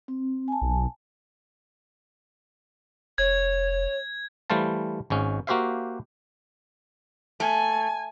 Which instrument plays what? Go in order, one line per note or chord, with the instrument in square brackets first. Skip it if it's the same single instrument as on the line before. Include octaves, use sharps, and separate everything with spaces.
[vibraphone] C4
G#5 A5
[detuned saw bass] B1
[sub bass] F1 [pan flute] C#5 [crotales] G#6
[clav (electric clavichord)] E3 G3 A3 C5 F5 A5
G#1 G#2 C#4
A#3 F#4 G4 C5 E5 F5
[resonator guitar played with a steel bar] A3 [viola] G#5